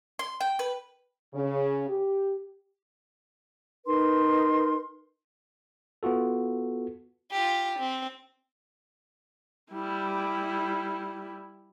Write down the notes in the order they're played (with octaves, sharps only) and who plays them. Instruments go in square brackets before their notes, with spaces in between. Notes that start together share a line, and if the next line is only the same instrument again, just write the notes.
[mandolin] C6
G5
B4
[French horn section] C#3
G4
[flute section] D#4 A#4 B4 C6
[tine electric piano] B3 F4 F#4 A4
[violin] F4 G4
C4
[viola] G3 E4